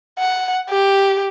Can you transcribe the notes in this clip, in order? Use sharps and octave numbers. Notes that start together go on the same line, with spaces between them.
F#5
G4